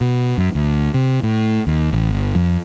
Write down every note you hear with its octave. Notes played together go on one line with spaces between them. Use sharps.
B2
F#2
D2
C3
A2
D#2
A1
G1
F2